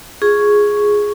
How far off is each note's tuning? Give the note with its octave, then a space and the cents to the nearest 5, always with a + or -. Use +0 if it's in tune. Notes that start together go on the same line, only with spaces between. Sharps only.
F4 +0 G#4 +0 C#6 +0